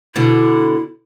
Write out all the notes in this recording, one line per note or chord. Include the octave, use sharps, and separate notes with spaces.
B2 D3 E4